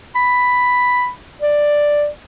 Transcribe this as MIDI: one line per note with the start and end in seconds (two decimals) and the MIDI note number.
0.15 1.09 83
1.42 2.07 74